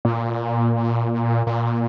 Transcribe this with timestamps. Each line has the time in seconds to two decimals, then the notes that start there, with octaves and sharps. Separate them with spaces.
0.05 A#2
1.47 A#2